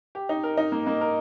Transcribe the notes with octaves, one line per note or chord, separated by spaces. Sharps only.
G4
D#4
A#4
D#4
A#3
A#3
A#4